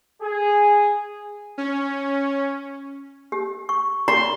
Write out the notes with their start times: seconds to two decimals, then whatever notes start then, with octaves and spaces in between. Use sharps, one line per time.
0.22 G#4
1.58 C#4
3.32 G4
3.69 C#6
4.08 A#5 C6